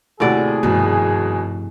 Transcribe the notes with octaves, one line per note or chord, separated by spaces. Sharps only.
D#2 A2 C3 F#4 G#4 D5
G#1 G2 B2 F3